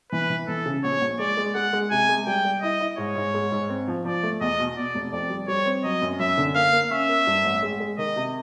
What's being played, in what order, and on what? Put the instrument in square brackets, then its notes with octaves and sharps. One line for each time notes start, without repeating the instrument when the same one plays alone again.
[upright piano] E3 [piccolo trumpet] B4
[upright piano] E3
[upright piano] E3 [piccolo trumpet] A4
[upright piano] C#3
[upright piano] A#1 [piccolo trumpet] C#5
[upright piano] A#1
[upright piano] G#3 [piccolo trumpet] D5
[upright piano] G#3
[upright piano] G#3 [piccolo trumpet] F#5
[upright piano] G#3
[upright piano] C3 [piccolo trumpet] G#5
[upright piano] G#3
[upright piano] G3 [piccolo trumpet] G5
[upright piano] G3
[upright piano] E4 [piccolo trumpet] D#5
[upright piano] E4
[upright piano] G#2 [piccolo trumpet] C#5
[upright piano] G#2
G#3
G#2
C4
F3
[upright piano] F3 [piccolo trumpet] D5
[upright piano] A3
[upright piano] E2 [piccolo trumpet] D#5
[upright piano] B2
[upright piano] B2 [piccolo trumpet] D5
[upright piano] F1
[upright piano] F2 [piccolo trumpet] D5
[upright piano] G3
[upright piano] G3 [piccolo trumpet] C#5
[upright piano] C4
[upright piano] F#3 [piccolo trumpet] D#5
[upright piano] F#2
[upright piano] F#2 [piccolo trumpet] E5
[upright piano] D3
[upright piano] A#3 [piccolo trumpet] F5
[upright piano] A#3
[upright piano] C#4 [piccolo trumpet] E5
[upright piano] A#3
G2
A1
G#3
G#3
[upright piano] D#3 [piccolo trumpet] D#5
[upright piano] C3